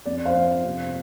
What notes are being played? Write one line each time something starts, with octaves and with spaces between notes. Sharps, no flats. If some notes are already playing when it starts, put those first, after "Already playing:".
F2 D5
C5 F5
F3
C3